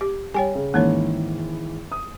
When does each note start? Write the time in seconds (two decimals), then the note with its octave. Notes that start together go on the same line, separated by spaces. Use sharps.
0.01 G4
0.34 G3 C#5 G5 G#5
0.55 C#3
0.74 G#2 D#3 E3 A#3 C#4 C#5
1.92 D#6